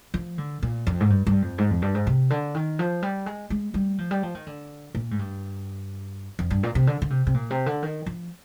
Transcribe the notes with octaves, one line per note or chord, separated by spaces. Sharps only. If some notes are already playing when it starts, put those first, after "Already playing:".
F3
D3
A#2
F2
G#2
G2
G2
F2
G#2
F2
G2
G#2
C3
D3
D#3
F3
G3
G#3
G#3
G3
F3
G3
F3
D#3
D3
A#2
G#2
G2
F2
G2
A#2
C3
D3
D3
C3
C3
A#2
C3
D3
D#3
F3